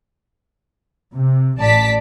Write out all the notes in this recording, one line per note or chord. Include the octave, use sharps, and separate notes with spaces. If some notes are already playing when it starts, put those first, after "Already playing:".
C3
A1 D5 A5 B6